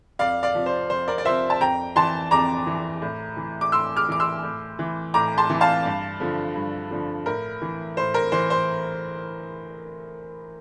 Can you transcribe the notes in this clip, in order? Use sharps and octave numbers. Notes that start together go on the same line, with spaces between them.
F2 D5 F5
D5 F5
C3 F3
C5
F2 C5
A#4 D5
D5
C3 F3 C5 E5
A5
F2 G5 A#5
E3 A5 C6
F2 A#5 D6
E3
A2
E3
D6
A2 C6 E6
D6 F6
E3 D6
C6 E6
A2
E3
A2 A#5 D6
A5 C6
E3
F5 A5
G2
D3 F3
G2
D3 F3
A2 A#4
E3
A2 C5
A#4
E3 C5
C5